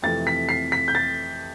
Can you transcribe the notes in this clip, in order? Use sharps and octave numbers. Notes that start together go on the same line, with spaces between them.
F2 C3 E3 A3 A6
B6
C7
B6
G6
A6